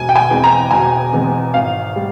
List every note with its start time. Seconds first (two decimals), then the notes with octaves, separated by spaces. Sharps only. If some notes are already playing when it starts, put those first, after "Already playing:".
Already playing: E1 G#5
0.09 G5
0.16 G#5
0.30 E2 E3 G#3 C4
0.44 A#5
0.71 E1 G#5
1.12 E2 E3 G#3 C4
1.54 G#1 F5
1.96 G3